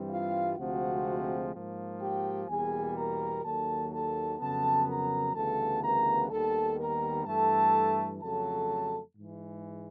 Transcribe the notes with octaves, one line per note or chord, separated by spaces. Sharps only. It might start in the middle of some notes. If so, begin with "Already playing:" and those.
Already playing: G2 E3 G3 C4
F4 F5
D2 C3 F3 G#3 C4 F#4 F#5
G#2 F3 A#3
G4 G5
E2 B2 G3 A#3 G#4 G#5
A#4 A#5
D#2 D#3 F#3 A#3 A4 A5
A4 A5
F2 C#3 F#3 B3 A4 A5
A#4 A#5
D2 C#3 E3 G3 B3 A4 A5
A#4 A#5
D#2 D#3 G3 B3 A4 A5
A#4 A#5
G2 E3 A3 A4 A5
F2 C#3 F#3 A3 A4 A5
G#2 E3 G#3